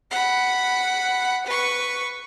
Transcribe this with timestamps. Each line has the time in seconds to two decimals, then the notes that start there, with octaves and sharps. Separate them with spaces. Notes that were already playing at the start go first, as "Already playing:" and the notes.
0.11 F#5 B5
1.46 B4 C#6